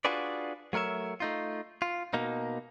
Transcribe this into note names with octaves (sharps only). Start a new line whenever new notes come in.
D4 F4 F#4 G#4 B4 D5
F#3 A3 A#4 C#5 E5
A3 D#4 F4
F4
B2 A#3 D#4